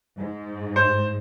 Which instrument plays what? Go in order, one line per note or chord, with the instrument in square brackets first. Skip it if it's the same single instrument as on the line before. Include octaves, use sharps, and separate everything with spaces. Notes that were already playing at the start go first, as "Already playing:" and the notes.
[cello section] G#2
[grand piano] C5